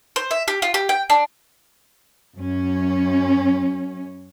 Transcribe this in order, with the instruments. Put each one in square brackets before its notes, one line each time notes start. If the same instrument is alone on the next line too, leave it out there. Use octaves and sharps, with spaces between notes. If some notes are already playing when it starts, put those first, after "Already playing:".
[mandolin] C5
E5
G4
F4
G4
G5
D4
[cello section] F#2 C#4